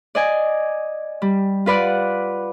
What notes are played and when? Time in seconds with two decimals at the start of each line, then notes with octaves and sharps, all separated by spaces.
0.15 D5 D#5 G#5
1.22 G3
1.66 F4 B4 D5 F#5